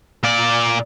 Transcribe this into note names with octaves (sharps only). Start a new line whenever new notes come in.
A#2 D5